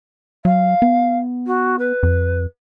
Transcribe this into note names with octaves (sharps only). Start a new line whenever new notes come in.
F#3 F5
B3
F#4
B4
F2